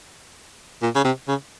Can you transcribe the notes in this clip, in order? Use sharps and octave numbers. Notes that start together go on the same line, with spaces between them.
A#2
C#3
C3
C#3